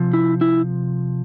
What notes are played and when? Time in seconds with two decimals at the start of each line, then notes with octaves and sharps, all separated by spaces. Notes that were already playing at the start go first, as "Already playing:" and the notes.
Already playing: C3 F3
0.13 E4
0.41 E4